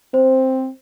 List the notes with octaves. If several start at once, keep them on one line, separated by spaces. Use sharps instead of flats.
C4 C5